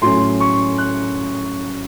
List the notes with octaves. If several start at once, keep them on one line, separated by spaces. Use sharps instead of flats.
A2 F#3 A3 C#4 C6
C#6
F#6